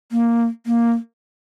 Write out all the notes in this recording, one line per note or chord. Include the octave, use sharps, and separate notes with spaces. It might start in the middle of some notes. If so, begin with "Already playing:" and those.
A#3
A#3